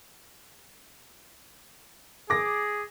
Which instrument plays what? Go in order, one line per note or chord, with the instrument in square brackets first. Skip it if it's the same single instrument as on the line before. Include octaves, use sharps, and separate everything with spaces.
[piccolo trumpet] G#4 [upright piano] D6 A#6